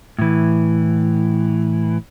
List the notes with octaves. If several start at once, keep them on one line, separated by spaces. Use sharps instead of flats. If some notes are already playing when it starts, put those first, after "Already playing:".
A2 E3